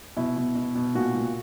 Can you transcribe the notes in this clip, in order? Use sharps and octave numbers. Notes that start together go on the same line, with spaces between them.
B2 E4
B2
B2
B2
A#2 F#4
A#2